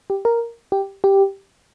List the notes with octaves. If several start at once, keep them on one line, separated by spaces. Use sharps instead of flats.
G4
A#4
G4
G4